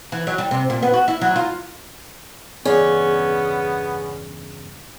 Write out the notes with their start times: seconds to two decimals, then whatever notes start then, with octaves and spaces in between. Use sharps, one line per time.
0.12 E3
0.27 F#3
0.38 G3
0.51 C3
0.70 A#2
0.82 B3
0.94 F#4
1.08 E4
1.21 F#3
1.36 F4
2.65 E2 G2 C#3 B3 C#4 G#4 D5